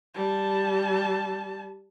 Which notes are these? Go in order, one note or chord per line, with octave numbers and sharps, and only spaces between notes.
G3 A5